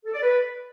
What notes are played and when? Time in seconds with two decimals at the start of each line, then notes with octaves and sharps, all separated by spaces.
0.05 A4
0.13 D5
0.22 B4